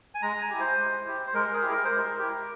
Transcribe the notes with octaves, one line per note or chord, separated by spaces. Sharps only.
G#5
G#3 A#5
G#5
E4 G4
C5
G#3
E4 G4
C5
G#3 A#4
G#4
E4 G4
A#4
C5
G#3
A#4
E4 G4